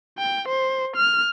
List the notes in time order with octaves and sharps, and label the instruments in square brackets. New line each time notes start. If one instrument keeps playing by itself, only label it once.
[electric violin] G5
C5
F6